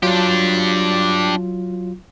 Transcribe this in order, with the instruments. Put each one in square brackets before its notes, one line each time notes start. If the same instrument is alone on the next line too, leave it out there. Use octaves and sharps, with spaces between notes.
[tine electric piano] F#3 F4 [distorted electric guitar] D4 G4